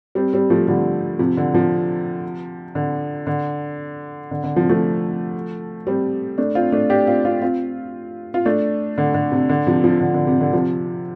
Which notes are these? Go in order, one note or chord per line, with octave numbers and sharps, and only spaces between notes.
G3 C4
G3 C4
F3 A3
D3 G3
C3 F3
D3
C3 F3
D3
D3
D3
D3
C3 F3
F3 A3
G3 C4
A3 D4
C4 F4
A3 D4
D4 G4
C4 F4
C4 F4
C4 F4
F4
A3 D4
D3
D3
C3
D3
C3 F3
C3 F3
D3
D3
C3
D3
C3 F3